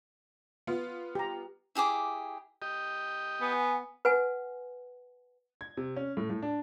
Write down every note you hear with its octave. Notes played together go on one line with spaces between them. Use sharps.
B3 F4
G4 A#5
E4 G4 G#4 D6
G4 D#5
B3 F#5 G#5
B4 F#5 G#5
G#6
C3
C#4
A2
A2
D4